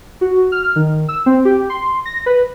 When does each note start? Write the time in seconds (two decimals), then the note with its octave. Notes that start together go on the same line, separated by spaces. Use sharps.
0.21 F#4
0.52 F6
0.76 D#3
1.09 E6
1.26 C4
1.45 G4
1.70 C6
2.06 A#6
2.26 B4